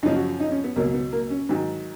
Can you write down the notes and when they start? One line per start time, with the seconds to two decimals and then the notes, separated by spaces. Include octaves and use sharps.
0.03 F#2 C#3 F3 D#4
0.16 F#4
0.40 D#4
0.51 C#4
0.64 B3
0.76 C#2 B2 F#3 A#3
0.94 B3
1.12 A#3
1.30 C#4
1.49 G#2 D#3 F#3